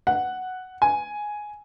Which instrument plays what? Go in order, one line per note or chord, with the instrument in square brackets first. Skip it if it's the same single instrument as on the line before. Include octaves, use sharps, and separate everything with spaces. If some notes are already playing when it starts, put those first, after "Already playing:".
[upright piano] F#5
G#5